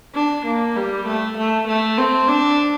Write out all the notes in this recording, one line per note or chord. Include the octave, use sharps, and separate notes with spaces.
D4
A#3
G3
A3
A3
A3
C4
D4